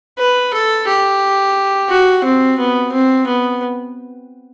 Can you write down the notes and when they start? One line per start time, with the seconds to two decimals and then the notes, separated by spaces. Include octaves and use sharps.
0.18 B4
0.53 A4
0.87 G4
1.90 F#4
2.24 C4
2.58 B3
2.92 C4
3.27 B3